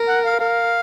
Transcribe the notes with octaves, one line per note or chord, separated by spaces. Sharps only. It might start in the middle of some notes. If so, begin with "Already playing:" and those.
Already playing: A#4
F#5
F5
A#4 F5